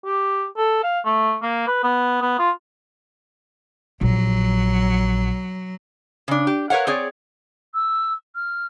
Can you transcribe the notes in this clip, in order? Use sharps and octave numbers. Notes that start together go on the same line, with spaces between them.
G4
A4
F5
A3
A#3
B4
B3
B3
F4
A#1 F#3
C#3 D4
G4
A#4 B4 C#5 F5 F#5
C4 G#4 C#5 D5
E6
F6